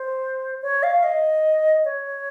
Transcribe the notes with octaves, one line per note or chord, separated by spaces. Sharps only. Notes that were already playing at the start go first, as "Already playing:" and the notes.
Already playing: C5
C#5
F5
D#5
C#5